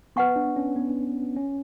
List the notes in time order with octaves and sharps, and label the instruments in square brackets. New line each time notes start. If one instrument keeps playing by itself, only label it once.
[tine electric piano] B3 [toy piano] B4 F#5 A5 C#6
[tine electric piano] D4
C#4
B3
C#4